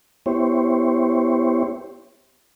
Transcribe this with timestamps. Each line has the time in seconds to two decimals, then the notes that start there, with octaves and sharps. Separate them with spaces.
0.26 B3 E4 G4 C5 C#5